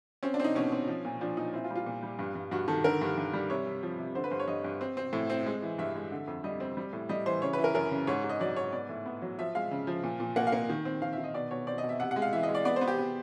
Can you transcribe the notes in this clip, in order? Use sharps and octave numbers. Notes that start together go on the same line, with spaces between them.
C4 C#4
D4
C4 D#4
B2 C#4
C4
F3
A#2
F3 D4
A#2 D#4
C4 E4
F4
G3
F4
A#2
G3
G2
G2
G2 F#4
D#3 A4
D3 A#4
G2
G2
G3
C3 C#5
C3
F3
C3
D3 C5
B4
G2 C5
C#5
G2 D#5
G2
C4
C4
A2
C4
G#3
E3
G2 E5
G#3
D3
F2
G3 D#5
C4
G3
A2
G3 D#5
E3 C5
C#3 C#5
B4
E3
A#4
F#2 A#4
C#3
G#2 C#5
G#2
D#5
F#3 D5
G#2 C#5
B3 D5
A2
B3
F#3
F3 E5
G#3 F5
C#3
F3
A#2
A#2
A#3 F#5
F5
A#3
D#3
C4
D#3 F5
E5
D#3
D#5
B2 D5
B2 C#5
C4 D5
D#5
B2
E5
C3 F#5
F#5
G#3
F5
E3 E5
D#5
G#3
D5
B3 D5
B3 C5
G4
B3